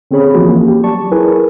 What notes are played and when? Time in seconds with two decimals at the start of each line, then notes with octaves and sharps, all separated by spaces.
0.11 D3 C4 C#4 G#4 C#5 B5
0.34 E3 F3 A#3 F4 F#4 G#4
0.66 G4
0.84 F#3 D5 A5 C#6
1.11 E4 G#4 A#4 B4 G#5